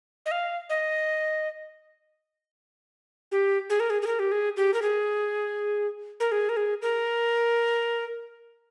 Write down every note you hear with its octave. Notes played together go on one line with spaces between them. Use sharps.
D#5
F5
D#5
G4
G#4
A#4
G#4
G#4
A#4
G4
G#4
G4
A#4
G#4
A#4
G#4
A#4
G#4
A#4